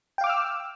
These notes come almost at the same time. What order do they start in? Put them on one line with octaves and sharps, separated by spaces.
G5 F5 D6 F6 E6